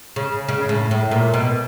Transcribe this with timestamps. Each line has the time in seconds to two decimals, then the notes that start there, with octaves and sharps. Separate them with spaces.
0.16 C#3
0.48 C#3
0.69 A2
0.91 A2
1.11 A#2
1.34 B2